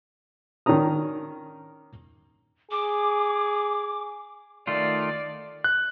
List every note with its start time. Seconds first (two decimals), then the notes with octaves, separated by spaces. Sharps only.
0.66 D#3 C#4 D4 A#5 D#6
2.72 G#4 D6
4.67 D#3 A3 F4 D5
5.64 F#6